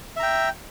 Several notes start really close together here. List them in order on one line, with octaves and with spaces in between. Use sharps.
E5 A#5 G5